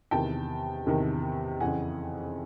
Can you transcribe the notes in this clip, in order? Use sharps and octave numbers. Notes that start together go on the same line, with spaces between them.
E2 C3 D#3 G5 A5
E2 C3 D#3
F2 C#3 E3 F#5 G#5